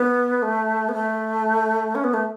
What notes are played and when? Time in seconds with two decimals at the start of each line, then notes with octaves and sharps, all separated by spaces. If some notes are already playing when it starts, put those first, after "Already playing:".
Already playing: B3
0.42 A3
0.89 B3
0.94 A3
1.95 C#4
2.04 B3
2.14 A3